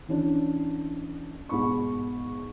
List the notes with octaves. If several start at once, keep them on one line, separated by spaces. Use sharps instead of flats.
E3 C#4 D4
G#2 B2 B5 C#6